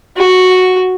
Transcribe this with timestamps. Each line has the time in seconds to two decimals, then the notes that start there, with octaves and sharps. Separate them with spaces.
0.17 F#4